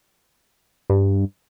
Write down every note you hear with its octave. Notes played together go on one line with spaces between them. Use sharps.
G2